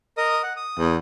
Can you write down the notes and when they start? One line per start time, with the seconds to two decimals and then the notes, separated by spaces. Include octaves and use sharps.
0.18 A#4 D#5 D#6
0.43 F#5
0.57 D#6
0.79 E2